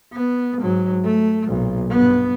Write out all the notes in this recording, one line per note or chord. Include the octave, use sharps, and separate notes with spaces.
B3
G#2 F#3
A3
B1 A#2
G2 B3